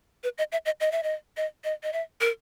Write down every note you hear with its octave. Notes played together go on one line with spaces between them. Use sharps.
B4
D#5
E5
D#5
D#5
E5
D#5
D#5
D#5
D#5
E5
A#4